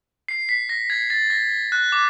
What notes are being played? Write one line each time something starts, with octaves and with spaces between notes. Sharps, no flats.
C7
B6
A#6
G#6
A6
A#6
F#6
D6